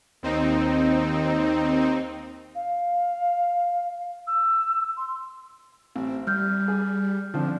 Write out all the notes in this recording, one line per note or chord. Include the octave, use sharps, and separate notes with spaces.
D#2 C4 D#4
F5
E6
C6
A1 C4
G3 F6 G6
G#4
D3 F3 C4 D4